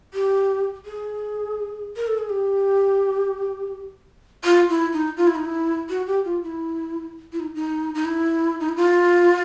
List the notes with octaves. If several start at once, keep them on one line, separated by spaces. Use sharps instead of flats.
G4
G#4
A#4
A4
G#4
G4
F4
E4
D#4
F4
E4
D#4
E4
F#4
G4
F4
E4
E4
D#4
D#4
D#4
E4
D#4
E4
F4